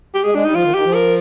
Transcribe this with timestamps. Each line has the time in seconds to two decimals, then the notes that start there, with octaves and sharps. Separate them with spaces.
0.15 G4
0.24 G#3 G#4
0.35 G#3 D4
0.44 G3 D#4
0.54 F3 F4
0.64 D#3
0.74 D#3 G4
0.85 F3
0.94 A#4